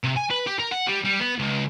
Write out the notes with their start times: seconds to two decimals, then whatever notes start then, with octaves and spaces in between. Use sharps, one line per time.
0.04 C3
0.17 G#5
0.31 B4
0.47 G4
0.59 A#4
0.72 F#5
0.87 G3
1.05 G3
1.20 B3
1.38 C#2